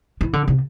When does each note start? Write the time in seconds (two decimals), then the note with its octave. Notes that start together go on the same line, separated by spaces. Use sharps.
0.21 E3
0.33 D3
0.48 C3